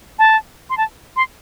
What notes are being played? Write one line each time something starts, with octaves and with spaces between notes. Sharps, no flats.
A5
C6
A5
C6